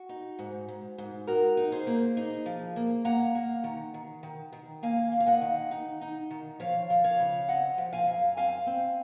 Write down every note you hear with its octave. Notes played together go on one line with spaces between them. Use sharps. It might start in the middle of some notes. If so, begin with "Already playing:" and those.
Already playing: F#4
D#4
G#2
G#2
G#2
D#4 F#4 A#4
D#4
G#4 C5
A#3
D#4
F3
A#3
A#3 F#5 A#5
A#3
D#3
D#3
D#3
D#3
A#3 F5 G#5
A#3
F5
D#5 F#5
D#3
D#4
D#4
D#3
F3 C#5 F5
F3
C#5 F5
C#3
C4 D#5 F#5
F3
F5 G#5
F#2
C4 F5 G#5
C4